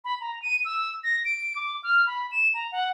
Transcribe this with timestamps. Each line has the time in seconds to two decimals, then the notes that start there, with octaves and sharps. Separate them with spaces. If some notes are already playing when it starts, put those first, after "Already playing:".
0.05 B5
0.21 A#5
0.42 D#7
0.65 E6
1.04 A#6
1.25 D7
1.56 D6
1.83 F6
2.07 B5
2.32 E7
2.54 A#5
2.72 F#5